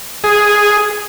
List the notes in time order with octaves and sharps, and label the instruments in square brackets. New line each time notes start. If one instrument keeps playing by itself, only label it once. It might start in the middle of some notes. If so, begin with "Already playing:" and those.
[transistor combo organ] G#4